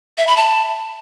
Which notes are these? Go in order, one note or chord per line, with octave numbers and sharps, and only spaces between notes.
E5
B5
A5